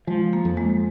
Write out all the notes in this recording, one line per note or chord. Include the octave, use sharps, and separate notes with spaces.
F3 G#3
A#3
F2
G#3